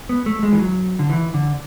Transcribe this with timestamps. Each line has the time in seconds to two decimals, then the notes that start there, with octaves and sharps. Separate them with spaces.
0.09 B3
0.26 A3
0.43 G#3
0.53 E3
0.59 F#3
0.99 D3
1.10 E3
1.34 D3